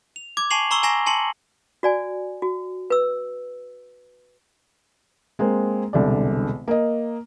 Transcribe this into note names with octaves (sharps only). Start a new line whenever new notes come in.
F7
D6 G#6
G#5 A5 C#6 C7 F7 F#7
A#5 C6 C#6 E6 G7
G#5 A#5 C#6 A#6 C7
G#5 A5 C6 C#7 F#7
F#4 D5 G#5
F#4
B4 E6
G#3 A#3 C4
E1 C2 D3 D5
A#3 D#5